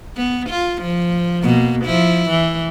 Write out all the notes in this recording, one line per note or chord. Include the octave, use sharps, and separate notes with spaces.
B3
F4
F3
B2 A#3
F3 E4
E3